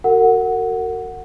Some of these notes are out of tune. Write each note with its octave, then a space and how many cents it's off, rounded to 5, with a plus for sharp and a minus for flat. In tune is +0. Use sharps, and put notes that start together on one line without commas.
F#4 +10 A#4 -40 F#5 +0